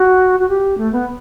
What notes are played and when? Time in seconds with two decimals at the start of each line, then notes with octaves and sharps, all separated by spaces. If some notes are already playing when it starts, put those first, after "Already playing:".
Already playing: F#4
0.40 F#4
0.49 G4
0.77 A3
0.92 B3